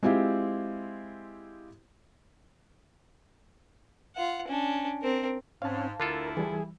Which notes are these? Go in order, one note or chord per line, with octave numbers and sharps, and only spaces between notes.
G#3 C4 E4 F4 G4
F4 F#5
C#4 D4
C4 A#4
G#2 C4 C#4 F5 A5
D2 D3 D4 E4 F4 A4 A#4
E3 G3 G#4